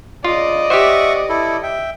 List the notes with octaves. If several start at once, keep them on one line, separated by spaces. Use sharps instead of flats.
C#3 F4 D5 D#5
G4 C5 E5 F#5 C#6
E4 A4
E5 G5